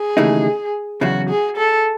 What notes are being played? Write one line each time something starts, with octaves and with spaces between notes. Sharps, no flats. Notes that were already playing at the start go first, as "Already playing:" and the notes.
Already playing: G#4
D#2 C#3 E3 A3 D#4
E2 C#3 F#3 F#4
G#4
A4